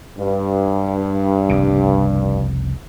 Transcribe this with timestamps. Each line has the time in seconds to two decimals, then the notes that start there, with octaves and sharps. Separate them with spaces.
0.18 G2
1.49 F1 C2 C#3